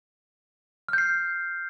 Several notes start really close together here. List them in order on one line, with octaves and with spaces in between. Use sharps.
F6 G6 C7